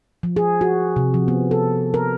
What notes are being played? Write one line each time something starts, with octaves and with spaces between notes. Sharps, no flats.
F3
G#4
F#4
C3
F3
B3
A4
A#4